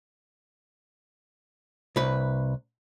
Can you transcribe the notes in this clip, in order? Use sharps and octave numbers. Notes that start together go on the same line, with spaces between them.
C2 B4